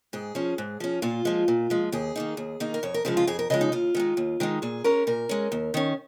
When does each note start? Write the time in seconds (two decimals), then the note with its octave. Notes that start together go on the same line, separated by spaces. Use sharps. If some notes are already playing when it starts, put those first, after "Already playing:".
0.13 G#2 G#4
0.35 F3 C#4
0.58 G#2
0.80 F3 C#4
1.02 A#2 F4
1.25 F3 G#3
1.48 A#2
1.70 F3 G#3
1.92 D#2 G#4
2.16 D#3 A#3 D#4
2.37 D#2
2.60 D#3 A#3 D#4
2.74 A#4
2.83 F2 C#5
2.94 A#4
3.05 C#3 F3 G#3 G#4
3.17 F4
3.27 F2 G#4
3.39 A#4
3.50 C#3 F3 G#3 D#5
3.61 D#4
3.72 D#2 F4
3.95 D#3 G#3 D#4
4.17 D#2
4.40 D#3 G#3 D#4
4.62 A#2 G#4
4.84 G#3 C#4 A#4
5.07 A#2 A#4
5.29 G#3 C#4
5.52 D#2
5.74 D#3 C#4